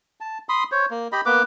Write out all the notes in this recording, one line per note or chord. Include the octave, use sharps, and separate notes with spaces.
A5
B5 C6 D#6
C5 C#5
A#3
G4 D#5 B5
A#3 B3 B4 D6